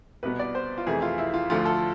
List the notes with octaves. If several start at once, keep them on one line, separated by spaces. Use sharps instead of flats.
C2 B2 B3 B4
D5
C5
F4
F2 C3 E3 A3 G#4
F4
E4
F4
D2 D3 F3 A3 F4
A4